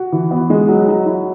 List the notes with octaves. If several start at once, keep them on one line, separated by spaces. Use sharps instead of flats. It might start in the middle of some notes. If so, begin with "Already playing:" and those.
Already playing: F#4
E3
B3
G#3
F#3
F#3
E4